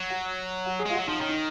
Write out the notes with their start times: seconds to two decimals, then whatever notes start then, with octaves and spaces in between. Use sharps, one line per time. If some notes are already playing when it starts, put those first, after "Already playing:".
Already playing: F#3
0.10 F#4
0.66 F#4
0.79 G#4
0.86 G#3 F4
0.93 F#4
0.98 F#3
1.07 F3 D#4
1.18 D#3 C#4
1.29 D#4